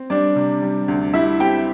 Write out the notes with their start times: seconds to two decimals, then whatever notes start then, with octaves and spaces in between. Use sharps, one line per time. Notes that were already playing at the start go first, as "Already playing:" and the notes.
Already playing: C4
0.10 G3 D4 D5
0.36 C3
0.62 G3
0.88 D2
1.13 G3 E4 E5
1.40 C4 G4 G5